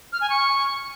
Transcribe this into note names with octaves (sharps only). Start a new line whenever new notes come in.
F6
G#5
C#6